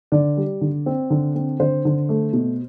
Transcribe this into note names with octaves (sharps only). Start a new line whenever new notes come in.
D3 D5
G3
D3
C4
D3
C4
D3 C5
D3
A3
B2